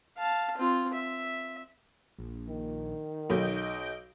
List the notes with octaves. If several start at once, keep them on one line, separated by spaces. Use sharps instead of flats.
F5 A5
C4 F4
E5
A#1
D#3
B1 D#5 G6 D7